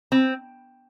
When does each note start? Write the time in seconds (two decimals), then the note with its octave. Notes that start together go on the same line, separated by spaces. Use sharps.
0.12 C4